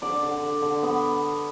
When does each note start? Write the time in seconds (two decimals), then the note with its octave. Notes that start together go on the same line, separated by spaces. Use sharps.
0.02 D3 D5
0.23 D3
0.42 D3
0.62 D3
0.82 B3